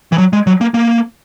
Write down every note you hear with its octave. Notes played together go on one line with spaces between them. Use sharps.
E3
F#3
G#3
F#3
A#3
A#3